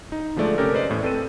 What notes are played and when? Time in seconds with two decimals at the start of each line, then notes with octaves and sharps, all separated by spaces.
0.12 D#4
0.36 D3 F3 G#3 A3 D5
0.58 C3 C#4 G4 A4 A#4
0.74 B4 C5 D5 D#5
0.89 E2 A2
1.03 C4 A4 B4 D#7